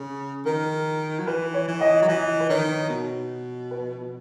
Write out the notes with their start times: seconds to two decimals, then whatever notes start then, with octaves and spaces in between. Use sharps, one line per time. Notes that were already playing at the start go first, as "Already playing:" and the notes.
Already playing: C#3 G#4
0.45 D#3 A#4
1.19 F#3
1.27 E3 B4
1.54 C#5
1.67 E3
1.81 D#5
2.02 F#3
2.08 E3 D#5
2.40 B4
2.49 D#3 C#5
2.89 B2
3.71 B4